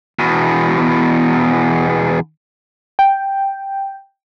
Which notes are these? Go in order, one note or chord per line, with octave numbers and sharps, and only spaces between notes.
E2 B2
G5